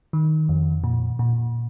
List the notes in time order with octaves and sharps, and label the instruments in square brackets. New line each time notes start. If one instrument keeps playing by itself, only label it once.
[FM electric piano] D#3
F2
A#2
A#2